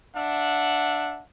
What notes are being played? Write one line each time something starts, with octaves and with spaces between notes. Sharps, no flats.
D4 E5 F#5